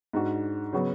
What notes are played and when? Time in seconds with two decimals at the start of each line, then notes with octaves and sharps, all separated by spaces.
0.13 G#2 G#3 D4 F#4
0.73 C#3 F#3 B3 F#4